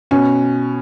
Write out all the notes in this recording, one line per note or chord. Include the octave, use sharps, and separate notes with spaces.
B2 C#4